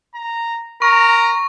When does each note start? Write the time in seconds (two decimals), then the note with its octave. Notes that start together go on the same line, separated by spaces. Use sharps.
0.15 A#5
0.82 A#4 A#5 C#6